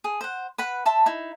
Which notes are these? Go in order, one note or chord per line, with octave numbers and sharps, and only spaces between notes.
G#4
C5 F#5
B4 F#5 B5
E5 A5 C6
D#4 E4